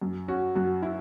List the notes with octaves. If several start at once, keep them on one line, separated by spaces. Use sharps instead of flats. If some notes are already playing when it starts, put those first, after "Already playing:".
F#2
C#4 F#4
F#2 F#4
E4